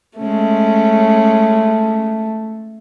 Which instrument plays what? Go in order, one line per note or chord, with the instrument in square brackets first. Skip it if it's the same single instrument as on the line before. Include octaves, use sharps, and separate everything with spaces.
[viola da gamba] G#3 C#4 [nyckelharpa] A3